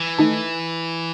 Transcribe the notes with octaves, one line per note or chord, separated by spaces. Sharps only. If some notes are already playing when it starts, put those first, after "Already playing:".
Already playing: E3
D#3 A3 D#4 A4